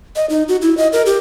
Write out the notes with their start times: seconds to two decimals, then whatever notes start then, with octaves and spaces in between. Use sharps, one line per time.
0.16 D#5
0.30 D#4
0.48 F#4
0.62 E4
0.77 D#5
0.93 A#4
1.06 G4